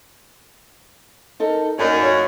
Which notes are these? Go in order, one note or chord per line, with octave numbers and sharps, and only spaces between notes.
D#4 A4 A#4
F#2 A#3 D#4 D5
D#4 F4 C#5